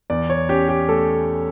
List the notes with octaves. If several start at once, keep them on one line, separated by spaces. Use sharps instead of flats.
E2 D5
C#5
C#4 G4
G4
A3 A4